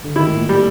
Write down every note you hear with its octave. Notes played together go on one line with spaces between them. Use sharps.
D3
D#3 E4
A2
A#2
G3